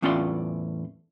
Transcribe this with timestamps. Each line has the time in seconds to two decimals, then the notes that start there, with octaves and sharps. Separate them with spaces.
0.02 E2 A2 C#4 F4 D5 C6